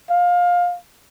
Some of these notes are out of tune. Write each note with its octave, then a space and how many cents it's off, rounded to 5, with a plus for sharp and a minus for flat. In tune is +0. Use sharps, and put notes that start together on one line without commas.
F5 +20